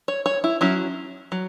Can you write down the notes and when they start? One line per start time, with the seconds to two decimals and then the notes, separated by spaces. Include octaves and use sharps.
0.08 C#5
0.26 C#5
0.44 E4
0.61 F#3 C#4 E4
1.32 F#3